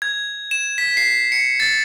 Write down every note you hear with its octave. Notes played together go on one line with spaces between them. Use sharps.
G#6
E7
B6
C7
C#7
A6